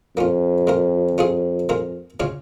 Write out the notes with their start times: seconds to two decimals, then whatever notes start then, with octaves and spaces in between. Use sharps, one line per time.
0.17 F2 A#3 C#4 F4
0.67 G#3 F4 A#4
1.18 C#4 F4 G#4 F5
1.69 G#3 F4 A#4
2.20 C#3 G#3 F4 C#5 F5